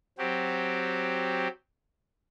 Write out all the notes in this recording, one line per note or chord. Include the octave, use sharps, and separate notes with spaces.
F#3 C4 G4